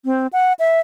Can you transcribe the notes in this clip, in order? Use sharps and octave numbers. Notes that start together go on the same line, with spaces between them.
C4
F#5
E5